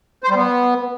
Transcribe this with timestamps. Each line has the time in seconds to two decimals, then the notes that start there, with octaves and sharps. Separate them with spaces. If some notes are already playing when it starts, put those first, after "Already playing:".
0.24 C5
0.30 G3
0.35 B3